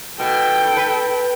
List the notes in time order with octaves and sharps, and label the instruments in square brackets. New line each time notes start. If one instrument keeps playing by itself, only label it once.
[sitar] B2 [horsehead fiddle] A4 G5
[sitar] B4